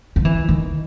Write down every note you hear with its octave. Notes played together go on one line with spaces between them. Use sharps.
F3
E3
D#3